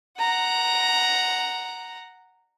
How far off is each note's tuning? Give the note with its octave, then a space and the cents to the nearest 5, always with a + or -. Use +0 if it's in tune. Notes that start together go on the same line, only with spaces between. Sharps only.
F#5 +0 A#5 +0